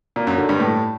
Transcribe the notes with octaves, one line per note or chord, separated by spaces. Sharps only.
A#2
F#2
D3
G2
A2